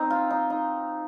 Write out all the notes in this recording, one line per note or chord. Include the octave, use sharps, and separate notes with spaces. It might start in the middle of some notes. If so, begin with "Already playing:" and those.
Already playing: C4 D#4
F4
D#4
D#4